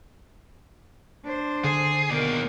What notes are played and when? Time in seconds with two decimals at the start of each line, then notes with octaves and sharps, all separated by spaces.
1.24 D4 C5
1.64 D3 G#4
2.09 D#2 B2 A#4 D5